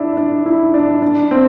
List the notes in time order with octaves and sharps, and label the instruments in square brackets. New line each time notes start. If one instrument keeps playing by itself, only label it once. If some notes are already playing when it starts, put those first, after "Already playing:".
Already playing: [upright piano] D4 E4
D4
E4
D4
D4
C4